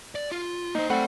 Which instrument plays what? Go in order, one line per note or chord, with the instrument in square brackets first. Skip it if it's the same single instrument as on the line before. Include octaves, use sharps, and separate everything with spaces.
[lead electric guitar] D5
F4
[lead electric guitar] A#3 C5 [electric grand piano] D#4
[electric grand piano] A3 C4 F#5 [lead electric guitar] D5 B5